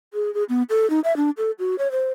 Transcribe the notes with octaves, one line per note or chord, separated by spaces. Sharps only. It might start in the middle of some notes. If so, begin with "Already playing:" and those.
G#4
G#4
B3
A4
D#4
E5
D4
A4
F#4
C#5
C5